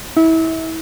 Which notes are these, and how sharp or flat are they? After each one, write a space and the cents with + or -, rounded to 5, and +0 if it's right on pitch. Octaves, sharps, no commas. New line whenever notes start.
E4 -30